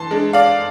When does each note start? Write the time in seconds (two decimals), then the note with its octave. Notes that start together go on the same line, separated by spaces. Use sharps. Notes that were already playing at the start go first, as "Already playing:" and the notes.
Already playing: E3 A5 C6
0.11 G#3 D4
0.33 D5 F5